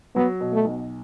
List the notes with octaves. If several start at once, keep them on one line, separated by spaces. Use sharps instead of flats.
F#3 B3
B2
A3
B1